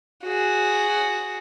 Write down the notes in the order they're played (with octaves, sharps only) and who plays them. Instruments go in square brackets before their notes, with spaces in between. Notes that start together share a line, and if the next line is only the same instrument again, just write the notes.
[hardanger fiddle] F#4 G#4